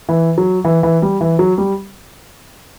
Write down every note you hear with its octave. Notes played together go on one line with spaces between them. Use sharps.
E3
F#3
E3
E3
G3
E3
F#3
G3